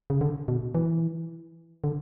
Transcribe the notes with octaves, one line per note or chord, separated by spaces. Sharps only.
C#3
D3
B2
E3
D3